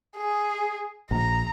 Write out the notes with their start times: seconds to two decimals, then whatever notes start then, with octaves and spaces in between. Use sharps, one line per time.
0.17 G#4
1.11 A#1 A#5